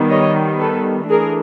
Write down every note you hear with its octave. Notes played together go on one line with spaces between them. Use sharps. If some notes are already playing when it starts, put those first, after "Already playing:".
Already playing: D#3 G3 B3
C#5 D#5
A4 B4
E3 A3 D4 G#4 A#4